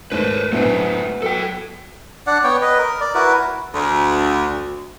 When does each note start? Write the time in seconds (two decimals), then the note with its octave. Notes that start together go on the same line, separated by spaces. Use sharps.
0.12 D#2 G#2 A3 B4 C5
0.53 F#2 A2 D3 A3 B3 C5 E5
1.22 F#3 A4 G5
2.27 D4 D5 F#5
2.44 B3 C#5 G5
2.62 B4 D#5
2.78 A#4
3.01 D5
3.15 E4 F#4 A#4 B4
3.74 D2